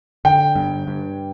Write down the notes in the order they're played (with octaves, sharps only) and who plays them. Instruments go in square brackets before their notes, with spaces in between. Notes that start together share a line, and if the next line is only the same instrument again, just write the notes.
[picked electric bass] D3 [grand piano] G5
[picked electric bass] G2
G2